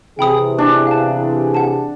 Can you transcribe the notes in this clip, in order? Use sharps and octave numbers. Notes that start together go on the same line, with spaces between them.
C3 E3 G#4 G5 B5 D#6
D4
F5 A5
F#5 A5